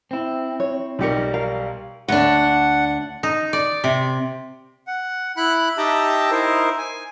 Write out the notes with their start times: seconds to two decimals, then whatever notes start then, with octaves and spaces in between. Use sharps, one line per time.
0.11 C4 E4
0.60 C#5
0.99 B1 G3 D#4 G4 A#4 C#7
1.34 A#4 F5
2.08 D2 D4 F#5
3.23 D#4
3.53 D5
3.84 C3
4.87 F#5
5.37 E4 B5 F#6
5.78 D#4 G4 E5 G5 A5 A#5
6.31 D#4 E4 A#4 C5
6.78 G#5